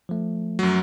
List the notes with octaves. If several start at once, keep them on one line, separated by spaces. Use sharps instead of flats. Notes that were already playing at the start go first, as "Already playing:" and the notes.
F3 A3
F#2 F#3